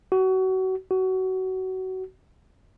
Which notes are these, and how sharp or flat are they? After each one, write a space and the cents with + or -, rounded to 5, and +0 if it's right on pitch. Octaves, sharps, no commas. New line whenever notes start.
F#4 +30
F#4 +25